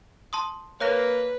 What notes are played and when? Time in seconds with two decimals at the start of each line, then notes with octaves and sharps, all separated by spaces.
0.33 A5 C6 D#6
0.80 A#3 B4 C#5 F#6 A#6